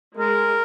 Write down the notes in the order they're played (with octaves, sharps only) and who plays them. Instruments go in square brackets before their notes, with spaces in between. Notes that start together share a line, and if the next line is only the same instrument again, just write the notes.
[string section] G#3 [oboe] A#4